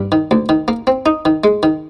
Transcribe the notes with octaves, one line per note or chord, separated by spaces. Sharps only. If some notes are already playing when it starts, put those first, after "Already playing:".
Already playing: G2
D#3
D2
D#3
A#3
C4
D#4
D#3
G#3
D#3